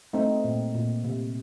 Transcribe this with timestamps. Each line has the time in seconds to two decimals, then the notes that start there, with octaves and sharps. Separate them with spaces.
0.13 A3 C4 D#4
0.44 A#2
0.75 A#2
1.04 C3